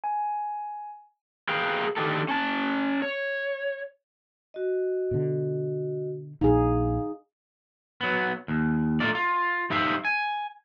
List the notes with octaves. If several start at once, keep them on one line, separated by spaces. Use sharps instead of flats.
G#5
G#4 A#4 B4 F5 G5
D3 D#3 G4 A4
C#4 A5
C#5
F#4 D#5
B2 D3
A#1 D#4 G#4 F5
F#3 B3
D#2
A3 D4 F4 A#4 D5
F4
G3 D#4 C5 E5 F5 G5
G#5